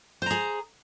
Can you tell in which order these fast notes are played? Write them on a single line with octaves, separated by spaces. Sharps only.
C5 A#5 G#4